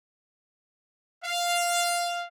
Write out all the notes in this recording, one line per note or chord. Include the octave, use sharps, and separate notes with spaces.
F5